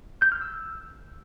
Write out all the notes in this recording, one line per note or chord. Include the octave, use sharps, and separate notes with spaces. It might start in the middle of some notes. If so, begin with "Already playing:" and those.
G6
F6
E6